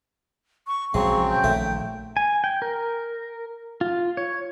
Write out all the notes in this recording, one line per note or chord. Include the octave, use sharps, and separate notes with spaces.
C#6
A#1 C#3 F#3 G#3 C4 C#6
G5
A#1 D#3 A3
G#5
G5
A#4
F4
C#5